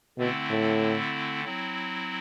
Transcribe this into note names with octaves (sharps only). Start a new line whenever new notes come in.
B2 D3 A3 C4 E4
A2
F#3 C4 E4